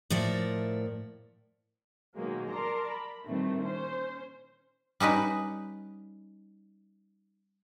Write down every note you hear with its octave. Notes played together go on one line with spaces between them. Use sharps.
A2 F3 A#4 D5 E5
B2 D#3 F#3 G#3 A#3
A#4 D5 A5 A#5 C6
B5
A#2 D#3 E3 G3 A3 C4
C#4 C5
G3 C#4 D#4 B4